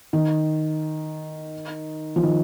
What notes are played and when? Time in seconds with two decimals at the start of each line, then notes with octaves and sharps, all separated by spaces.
0.13 D#3
2.16 F3
2.23 D#3